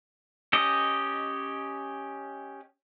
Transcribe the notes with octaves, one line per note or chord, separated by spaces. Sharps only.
C#4 G4 D#5